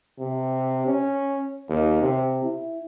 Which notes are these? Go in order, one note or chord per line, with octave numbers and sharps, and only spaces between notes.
C3
C#4
D#2
C3
E4